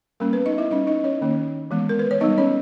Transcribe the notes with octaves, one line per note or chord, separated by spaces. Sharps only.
G3 A#3 C#4 A#4
B3 B4
D#4 D#5
E4 E5
G3 C#4 D#4 D#5
D#4 D#5
C#4 C#5
D#3 A#3 C#4
E3 G#3 B3
A#4
B4
C#5
G3 B3 D#4 D#5
C#4 C#5